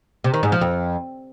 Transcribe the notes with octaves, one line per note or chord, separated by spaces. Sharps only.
C3
D#3
G#2
F3
F2